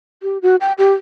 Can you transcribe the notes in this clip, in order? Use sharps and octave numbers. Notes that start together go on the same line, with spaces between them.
G4
F#4
G5
G4